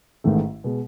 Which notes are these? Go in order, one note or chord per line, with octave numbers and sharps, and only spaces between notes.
A1 G#2 D#3 A3
B2 G#3